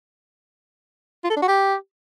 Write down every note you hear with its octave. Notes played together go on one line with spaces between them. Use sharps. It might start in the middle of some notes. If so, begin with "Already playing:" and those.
F4
A4
D4
F#4
G4